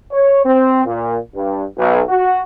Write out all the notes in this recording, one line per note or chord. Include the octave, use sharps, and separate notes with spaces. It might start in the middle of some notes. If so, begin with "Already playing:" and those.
C#5
C4
A#2
G2
B1
F#4